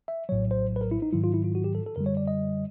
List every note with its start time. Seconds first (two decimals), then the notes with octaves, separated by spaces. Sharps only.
0.08 E5
0.29 A#1 A2 F#3 C#5
0.51 C5
0.76 B4
0.81 A#4
0.91 E4
1.02 D#4
1.12 G#2 D#3 F#3 E4
1.24 F4
1.34 E4
1.44 F4
1.55 F#4
1.64 G4
1.75 A4
1.86 A4
1.96 F#2 D3 G3 A#4
2.06 C#5
2.17 D5
2.28 D#5